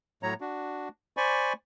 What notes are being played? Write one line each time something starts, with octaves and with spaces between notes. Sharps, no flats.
A2 F#3 C#5 A#5
D4 F#4
C5 D5 G#5 B5 C#6